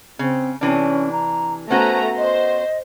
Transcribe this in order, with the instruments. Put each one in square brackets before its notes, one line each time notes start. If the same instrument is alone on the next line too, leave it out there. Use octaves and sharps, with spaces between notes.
[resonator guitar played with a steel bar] C#3 [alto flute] C4
[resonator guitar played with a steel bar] C3 E3 D4 [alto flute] C#4
[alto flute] A#5
[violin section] A3 A#5 [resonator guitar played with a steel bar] B3 C#4 F#4 [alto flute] C5
[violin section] C5 [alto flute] D#5